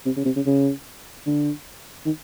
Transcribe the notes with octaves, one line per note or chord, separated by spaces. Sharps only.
C3
C#3
C3
C#3
C#3
D3
D#3